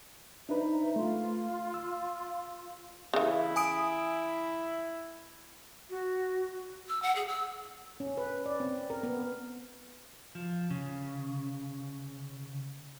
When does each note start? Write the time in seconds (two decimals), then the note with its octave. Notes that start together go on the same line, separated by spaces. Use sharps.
0.49 D4 D#4 B4 C5 E5 A#5
0.96 A3 F4 C6
1.74 E6
3.14 C#3 E3 E4
3.56 G#5 D#6 D7
5.89 F#4
6.89 E6
7.02 F#5
7.15 G#4
7.28 E6
8.00 C#4
8.17 B4
8.46 D5
8.60 C4
8.90 A#4
9.03 B3
10.35 F3
10.70 C#3